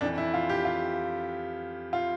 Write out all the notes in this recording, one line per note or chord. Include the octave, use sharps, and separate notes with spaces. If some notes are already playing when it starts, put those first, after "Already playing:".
F2 E3 D4
E4
F4
G4
F4
F4